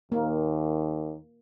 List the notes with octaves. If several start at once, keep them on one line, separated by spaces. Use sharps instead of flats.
D#2 A#3